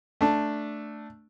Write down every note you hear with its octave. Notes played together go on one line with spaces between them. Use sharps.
A3 D4